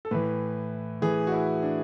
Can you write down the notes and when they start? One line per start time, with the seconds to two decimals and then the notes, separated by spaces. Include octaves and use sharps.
0.05 A4
0.11 A2 E3 B4
1.02 A2 E3 G#4
1.27 F#4
1.32 E4
1.63 D4